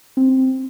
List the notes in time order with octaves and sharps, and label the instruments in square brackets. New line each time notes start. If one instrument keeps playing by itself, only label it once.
[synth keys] C4